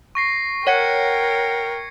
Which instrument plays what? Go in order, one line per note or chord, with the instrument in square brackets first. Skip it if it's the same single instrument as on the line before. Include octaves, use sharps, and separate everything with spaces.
[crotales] C#6 A#6 C7
[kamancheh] A#4 G5 [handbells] C#5 F#5 [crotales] C#6 G#6 C#7